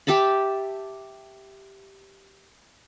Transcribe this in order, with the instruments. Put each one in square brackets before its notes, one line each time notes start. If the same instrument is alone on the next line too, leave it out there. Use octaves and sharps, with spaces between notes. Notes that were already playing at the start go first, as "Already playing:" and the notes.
[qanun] G4 E5 A5 B5